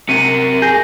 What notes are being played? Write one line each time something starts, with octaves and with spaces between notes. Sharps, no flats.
C3 F#3 A#4 C#7 D#7
G#4 G6 A#6